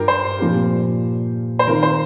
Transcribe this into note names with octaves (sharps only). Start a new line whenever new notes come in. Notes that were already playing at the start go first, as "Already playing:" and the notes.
Already playing: G2 G3 F4 G4 A#4
C5
A#2 F3 C4 G4
C5
D#3 C4 F4 A#4
C5